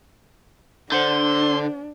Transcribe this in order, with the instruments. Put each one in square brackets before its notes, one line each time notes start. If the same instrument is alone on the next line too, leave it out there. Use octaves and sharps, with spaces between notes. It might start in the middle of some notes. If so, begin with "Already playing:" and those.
[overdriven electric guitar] D3 [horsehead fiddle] D4 [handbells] C5 F#5 G6 [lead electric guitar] C6